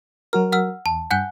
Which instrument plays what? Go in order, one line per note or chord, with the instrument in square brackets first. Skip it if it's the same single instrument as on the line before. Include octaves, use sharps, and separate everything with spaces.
[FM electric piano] F#3 F#4 A#4 [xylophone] F6
[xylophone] F#5 E6 F6
[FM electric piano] E2 [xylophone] A5
[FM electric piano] G2 G6 [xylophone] F#5 G#5 F#6